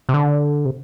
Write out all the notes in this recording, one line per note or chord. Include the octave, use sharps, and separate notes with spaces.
C3
D3
C3